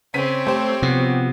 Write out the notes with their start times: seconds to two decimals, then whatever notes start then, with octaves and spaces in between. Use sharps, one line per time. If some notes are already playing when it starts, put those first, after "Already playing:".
0.14 C#3 C4 C#5 B6 D#7
0.47 A3 G4 C5
0.82 C3 F3 B3 F#4